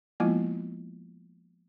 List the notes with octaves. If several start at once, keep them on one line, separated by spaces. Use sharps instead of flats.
F3 G#3 A#3 B3 E4 F4